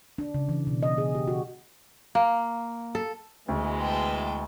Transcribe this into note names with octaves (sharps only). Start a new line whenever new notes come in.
D4
C#3
E3
B2
D#5
G#4
G4
F#4
A#3
A4
D2 B2 E3 G#3
G5 A5